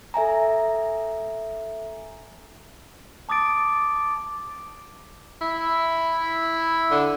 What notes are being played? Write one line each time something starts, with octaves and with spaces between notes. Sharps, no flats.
A4 E5 G#5 A#5
A5 D6 D#6 A6 D7
E4
D3